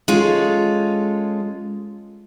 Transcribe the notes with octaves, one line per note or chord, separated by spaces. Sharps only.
G#3 C#4 F4 A4